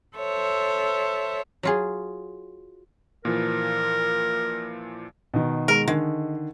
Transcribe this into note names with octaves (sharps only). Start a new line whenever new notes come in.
A4 C5 C#5 E5
F#3 F4 G#4
A#2 E3 F3 A#4
B2 D#3
G#3 A#4
D3 D#3 G#3